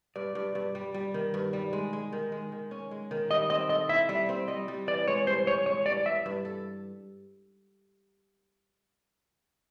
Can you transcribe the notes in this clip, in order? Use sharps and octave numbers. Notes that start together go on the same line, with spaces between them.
G2 D5
G2
G2
G3
G3
D#3
G2
G3
G#3
G#3
D#3
G#3
D#3
C#4
G#3
D#3
G3 D#5
C4 D#5
A4 D#5
E4 E5
G3 E5
C4
G3 D#5
G3
E3 D5
G#3 C#5
G2 C5
G#3 C#5
G#3 C#5
G2 D5
G2 E5
G2
A4